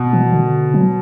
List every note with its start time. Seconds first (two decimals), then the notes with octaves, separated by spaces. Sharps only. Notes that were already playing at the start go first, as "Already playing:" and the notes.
Already playing: B2
0.13 E3
0.32 D3
0.74 F#3